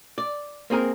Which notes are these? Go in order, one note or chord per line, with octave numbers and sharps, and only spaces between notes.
D5
A#3 C4 G#4 A#4